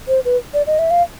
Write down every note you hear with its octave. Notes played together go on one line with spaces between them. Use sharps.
C5
B4
D5
D#5
E5
F5